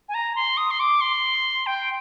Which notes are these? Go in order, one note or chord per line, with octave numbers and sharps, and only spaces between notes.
G#5
A#5
C6
D#6
C6
D6
C6
G5